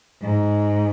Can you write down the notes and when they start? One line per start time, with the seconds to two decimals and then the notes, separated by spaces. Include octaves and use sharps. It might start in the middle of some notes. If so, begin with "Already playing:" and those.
0.22 G#2